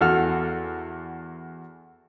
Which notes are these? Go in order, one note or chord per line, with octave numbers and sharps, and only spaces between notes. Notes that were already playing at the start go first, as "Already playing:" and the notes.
E2 F#4 A4 F6